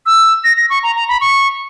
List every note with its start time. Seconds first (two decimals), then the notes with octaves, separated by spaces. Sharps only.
0.06 E6
0.44 A#6
0.57 A#6
0.70 C#6
0.83 A#5
0.96 A#5
1.08 B5
1.21 C#6